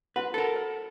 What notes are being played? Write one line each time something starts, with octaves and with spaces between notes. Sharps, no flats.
E4 F#4 B4 F#5
A4 A#4
C5